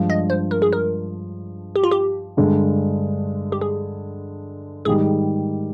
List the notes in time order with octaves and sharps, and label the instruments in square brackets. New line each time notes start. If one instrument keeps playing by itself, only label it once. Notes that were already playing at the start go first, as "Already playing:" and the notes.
Already playing: [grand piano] G2 F3 G#3 D4
[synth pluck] D#5
C5
A#4
G#4
A#4
G4
F4
G4
[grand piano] G2 D3 G#3
[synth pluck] G4
G#4
[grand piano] G#2 D#3 G3 [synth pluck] G#4